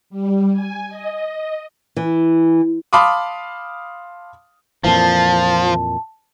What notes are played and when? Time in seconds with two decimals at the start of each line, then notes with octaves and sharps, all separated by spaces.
0.10 G3
0.52 G#5
0.89 D#5
1.97 E3
2.93 F5 A5 B5 C6 D6 D#6
4.84 F2 A#2 E3 F3 A5